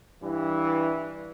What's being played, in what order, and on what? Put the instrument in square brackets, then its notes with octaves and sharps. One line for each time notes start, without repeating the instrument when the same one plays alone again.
[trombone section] G2 E3